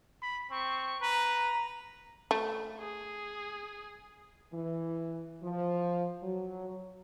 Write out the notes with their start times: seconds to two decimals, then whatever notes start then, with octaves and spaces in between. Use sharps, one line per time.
0.22 B5
0.51 C4 C#6
1.01 B4 A#5
2.31 A3
2.80 G#4
4.53 E3
5.43 F3
6.23 F#3